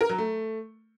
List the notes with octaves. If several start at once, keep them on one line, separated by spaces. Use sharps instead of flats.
A#4
F#3
A3